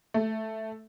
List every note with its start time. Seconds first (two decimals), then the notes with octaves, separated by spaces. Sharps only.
0.14 A3